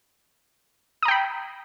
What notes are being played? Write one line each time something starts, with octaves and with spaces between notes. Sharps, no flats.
G5 A#5 B5 D#6